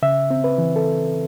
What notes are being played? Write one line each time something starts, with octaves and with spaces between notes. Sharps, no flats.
C#3 E5
C4
B4
E3
A4